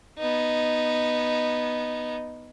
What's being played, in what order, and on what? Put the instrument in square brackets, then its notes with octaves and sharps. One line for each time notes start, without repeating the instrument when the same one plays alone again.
[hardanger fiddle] B3 D#4